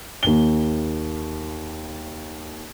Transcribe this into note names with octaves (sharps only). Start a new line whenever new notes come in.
D#2 G7